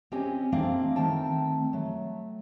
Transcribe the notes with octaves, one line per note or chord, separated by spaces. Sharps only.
C4 C#4 G4 D#5 G#5
A3 A#3 C4 D4 D#5 F5
D#3 A3 C4 G5 A5
F#3 A3